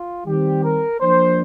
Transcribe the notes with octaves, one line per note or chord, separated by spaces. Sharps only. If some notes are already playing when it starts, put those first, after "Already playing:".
Already playing: F4
D#3 G3 C4 G4
A#4
F3 A#3 D4 C5